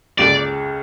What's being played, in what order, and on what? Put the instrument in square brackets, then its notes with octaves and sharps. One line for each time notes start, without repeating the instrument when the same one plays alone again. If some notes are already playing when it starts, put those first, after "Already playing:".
[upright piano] C#2 C#3 [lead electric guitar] D5